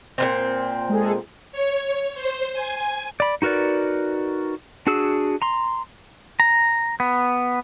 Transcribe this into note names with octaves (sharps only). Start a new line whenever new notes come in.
A#2 C#3 C4
G#3 G#4 A4
C#5
C5
G#5
D5 B5
D#4 F#4 A#4 B4 D5
D4 F#4 G#4 E6
A#5 C6
A#5
B3